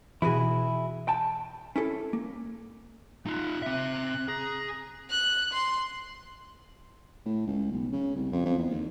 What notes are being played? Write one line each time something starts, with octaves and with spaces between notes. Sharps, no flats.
B2 E3 E4 F#4 G#4
G5 A5
C#4 E4 A4
A#3
D#4 F4 F#6
C4 E5
G#4 A#5
F#6
C6
A2
C#2
B1
C#3
C2
F2
F2
E2
D#2